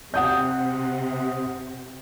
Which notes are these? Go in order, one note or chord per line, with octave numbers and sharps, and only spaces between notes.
C3 F#5 D#6 G6